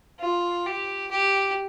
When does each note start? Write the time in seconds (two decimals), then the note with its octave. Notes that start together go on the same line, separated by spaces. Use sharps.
0.20 F4
0.66 G4
1.11 G4